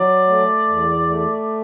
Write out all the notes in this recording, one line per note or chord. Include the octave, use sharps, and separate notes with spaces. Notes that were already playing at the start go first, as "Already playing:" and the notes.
Already playing: F#3 D5
A3
E2
A3